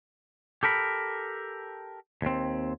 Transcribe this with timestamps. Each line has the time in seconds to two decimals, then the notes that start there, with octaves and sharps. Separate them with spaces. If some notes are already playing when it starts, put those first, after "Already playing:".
0.63 G4 A4 A#4 B5
2.22 D#2 C4